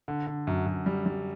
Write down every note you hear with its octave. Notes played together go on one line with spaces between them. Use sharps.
D3
D3
F#2
F#2
G3
G3